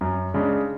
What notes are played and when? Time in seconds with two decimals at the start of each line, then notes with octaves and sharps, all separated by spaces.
0.01 F#2
0.34 C#3 G#3 D4